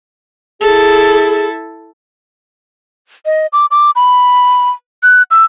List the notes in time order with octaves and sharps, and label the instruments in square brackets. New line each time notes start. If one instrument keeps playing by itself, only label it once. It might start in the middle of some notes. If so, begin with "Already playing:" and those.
[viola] E4 A4 [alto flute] G#4
[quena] D#5
D6
D6
B5
F#6
E6